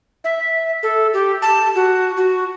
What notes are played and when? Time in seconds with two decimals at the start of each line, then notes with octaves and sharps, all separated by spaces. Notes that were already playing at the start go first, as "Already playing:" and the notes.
0.24 E5
0.83 A4
1.14 G4
1.42 A5
1.75 F#4
2.17 F#4